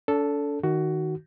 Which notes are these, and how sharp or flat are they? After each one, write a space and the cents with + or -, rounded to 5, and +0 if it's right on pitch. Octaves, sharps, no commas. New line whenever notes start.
D4 -45 A4 +0
D#3 +0 F#4 +15